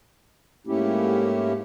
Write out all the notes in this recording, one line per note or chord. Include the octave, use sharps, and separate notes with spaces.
G#2 A3 A#3 C#4 E4 G4